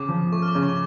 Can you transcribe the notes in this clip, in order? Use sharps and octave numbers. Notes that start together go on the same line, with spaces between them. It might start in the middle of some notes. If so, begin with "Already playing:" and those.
Already playing: C#3 D6
F3
A3 C#6
F6
D6
C#3
C#6